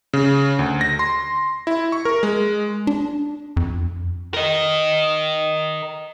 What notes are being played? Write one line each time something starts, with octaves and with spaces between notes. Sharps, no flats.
C#3
D2
A#6
C6
E4
C#6
A#4
G#3
D4
F2
A#4 D#5